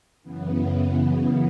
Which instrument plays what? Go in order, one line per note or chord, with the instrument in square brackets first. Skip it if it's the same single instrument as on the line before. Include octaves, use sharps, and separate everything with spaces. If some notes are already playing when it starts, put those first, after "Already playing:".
[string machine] F#2 C#3 E3 B3